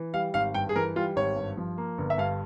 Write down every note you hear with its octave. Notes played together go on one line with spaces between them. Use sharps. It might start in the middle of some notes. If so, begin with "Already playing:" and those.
Already playing: E3
G3 F5
G#1 F5
G2 G5
G#4
E3 A#4
G3 F4
G#1 C#5
G2
F3
A#3
G1
E5
G2 F5